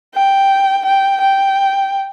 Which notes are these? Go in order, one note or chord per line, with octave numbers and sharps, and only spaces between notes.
G5
G5
G5